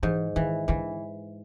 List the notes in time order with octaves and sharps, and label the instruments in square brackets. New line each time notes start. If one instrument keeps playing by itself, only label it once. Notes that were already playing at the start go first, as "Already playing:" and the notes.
[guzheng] G#2 [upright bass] E3
[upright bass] D#3 [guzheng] E3
[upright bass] D3 [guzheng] E3